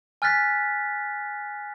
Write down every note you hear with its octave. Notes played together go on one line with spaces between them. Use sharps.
G#5 F6 F#6 A6 B6